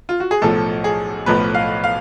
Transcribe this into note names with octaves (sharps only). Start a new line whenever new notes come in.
F4
F#4
G#4
B1 A2 F3 A4
G#4
B1 A2 F3 B4
F5
F5